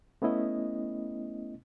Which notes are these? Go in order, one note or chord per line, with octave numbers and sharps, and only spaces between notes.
A3 B3 C#4 E4 D#5